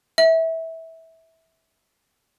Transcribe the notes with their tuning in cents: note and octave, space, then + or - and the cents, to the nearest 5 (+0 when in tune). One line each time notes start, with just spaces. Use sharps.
E5 -20